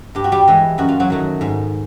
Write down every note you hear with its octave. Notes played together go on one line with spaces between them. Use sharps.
G2 G4
F#4
G3 G4
E3 G#3
F#2 F#4
F4
F#3 F#4
D#3 F#3 A3
G#2